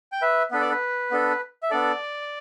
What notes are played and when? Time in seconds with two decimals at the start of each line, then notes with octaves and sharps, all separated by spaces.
0.12 G5
0.22 B4 E5
0.51 B3 D4 A4 B4
0.61 D5
0.71 B4
1.11 B3 D4 A4
1.63 E5
1.71 B3 D4 A4 D5